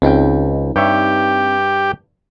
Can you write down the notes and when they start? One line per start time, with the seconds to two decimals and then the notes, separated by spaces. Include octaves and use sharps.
0.02 C#2 C4 D#4 G5
0.76 G2 G4 C#5 E5